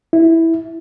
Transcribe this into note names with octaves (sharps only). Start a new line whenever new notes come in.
E4